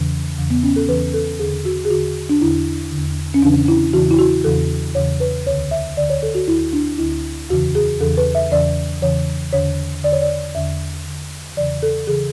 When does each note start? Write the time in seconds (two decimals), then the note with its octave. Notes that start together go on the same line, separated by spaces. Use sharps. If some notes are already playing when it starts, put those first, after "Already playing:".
Already playing: E2 C#3 E3
0.38 E2 C#3 E3
0.50 B3
0.63 C#4
0.76 A4
0.88 E2 C#3 E3 B4
1.14 A4
1.39 E2 D3 G#4
1.65 F#4
1.85 G#4
1.90 E2 D3 F#4
2.29 D4
2.41 E2 D3 E4
2.92 D3
2.97 E2
3.34 C#4
3.42 E2 C#3 E3 D4
3.68 E4
3.94 E2 C#3 E3 F#4
4.11 E4
4.19 F#4
4.44 E2 C#3 E3 A4
4.95 E2 C#3 E3 C#5
5.20 B4
5.46 D2 C#5
5.50 D3
5.71 E5
5.97 D2 D3 D5
6.10 C#5
6.23 A4
6.35 F#4
6.48 D2 D3 E4
6.73 D4
6.98 D2 D3 E4
7.49 E2 C#3 E3 F#4
7.75 G#4
8.00 E2 C#3 E3 A4
8.17 B4
8.35 E5
8.51 E2 C#3 E3 D5
9.02 E2 C#3 E3 C#5
9.53 E2 D3 C#5
10.03 E2 D3 D5
10.12 C#5
10.22 D5
10.55 E2 D3 E5
11.05 E2 D3
11.56 E2 C#3 E3 D5
11.83 A4
12.07 C#3 E3 G#4